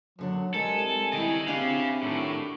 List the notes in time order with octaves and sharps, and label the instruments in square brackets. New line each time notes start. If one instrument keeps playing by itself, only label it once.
[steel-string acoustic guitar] F#2 D3 D4 [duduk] F#3
[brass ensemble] C2 G#5 [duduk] G#3 [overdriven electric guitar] A4 [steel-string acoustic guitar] A#4
[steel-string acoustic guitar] D#3 [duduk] E4 [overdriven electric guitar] D#5 G5
[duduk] C4 [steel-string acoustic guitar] D4 E4 G4 [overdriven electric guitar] G#4 F5
[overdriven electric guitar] A2 [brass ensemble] D#3 F#3